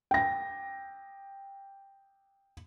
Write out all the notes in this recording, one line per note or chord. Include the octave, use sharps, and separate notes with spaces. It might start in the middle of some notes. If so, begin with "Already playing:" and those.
G5 A#6